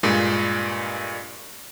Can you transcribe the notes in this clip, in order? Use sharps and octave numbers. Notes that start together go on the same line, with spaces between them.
G2 A#2 G#3